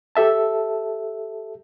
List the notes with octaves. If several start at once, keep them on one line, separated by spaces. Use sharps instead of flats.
G4 A4 E5 A5